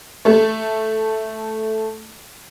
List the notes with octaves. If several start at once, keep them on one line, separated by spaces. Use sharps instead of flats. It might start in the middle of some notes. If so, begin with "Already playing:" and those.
A3 A4